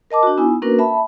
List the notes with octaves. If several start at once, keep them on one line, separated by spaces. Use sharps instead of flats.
A#4 D#5 A5 D6
D4 F#4
B3 D#4 E4 G#5
A#3 C#4 D4 F#4 A#4 B4
E5 A5 B5